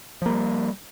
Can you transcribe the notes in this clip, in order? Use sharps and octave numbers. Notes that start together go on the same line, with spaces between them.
F3 G3 A#3